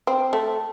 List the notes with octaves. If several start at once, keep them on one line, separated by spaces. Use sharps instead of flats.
C4
A3